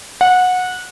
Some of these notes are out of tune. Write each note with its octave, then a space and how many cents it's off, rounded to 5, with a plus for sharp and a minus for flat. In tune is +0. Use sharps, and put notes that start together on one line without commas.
F#5 -20